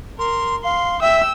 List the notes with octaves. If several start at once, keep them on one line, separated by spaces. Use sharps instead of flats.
A#4 C6
F5 C6
E5 G5 E6